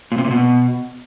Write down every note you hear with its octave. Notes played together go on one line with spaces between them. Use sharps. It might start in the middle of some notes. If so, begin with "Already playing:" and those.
A#2
C3
A#2
B2